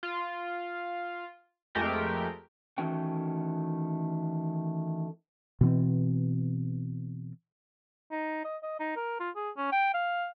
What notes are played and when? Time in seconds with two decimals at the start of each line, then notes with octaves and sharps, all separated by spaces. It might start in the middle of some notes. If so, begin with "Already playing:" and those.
0.03 F4
1.75 F2 G#3 A3 G4 A#4 G5
2.78 D#3 E3 A3 C#4 F#4 G5
5.61 B2 E3 C4
8.11 D#4
8.45 D#5
8.63 D#5
8.80 D#4
8.96 A#4
9.20 F4
9.36 G#4
9.57 C#4
9.72 G5
9.94 F5